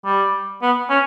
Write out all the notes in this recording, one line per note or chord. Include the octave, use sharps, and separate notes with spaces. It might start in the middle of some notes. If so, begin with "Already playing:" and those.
G3
B3
C#4